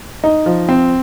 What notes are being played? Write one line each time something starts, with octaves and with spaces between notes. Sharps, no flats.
D#4
F3
C4